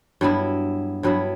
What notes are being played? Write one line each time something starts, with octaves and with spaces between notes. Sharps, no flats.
G2 F#3 B3 E4
G2 F#3 B3 E4